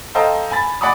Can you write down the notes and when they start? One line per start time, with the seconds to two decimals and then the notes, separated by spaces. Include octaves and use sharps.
0.15 A4 C5 D#5 F5 G5 A#5
0.51 G#5 B5 A6
0.81 D5 F#5 G#5 B5 D6 D#6